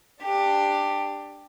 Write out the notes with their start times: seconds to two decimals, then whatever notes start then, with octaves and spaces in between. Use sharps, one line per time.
0.23 D4 G4